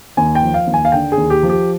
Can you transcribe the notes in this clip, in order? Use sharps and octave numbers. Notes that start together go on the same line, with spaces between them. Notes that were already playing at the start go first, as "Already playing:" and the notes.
D#2 G#5
G5
F3
F5
D#2
G#5
F5
D3 G5
G#4
D#2
G4
F3
G4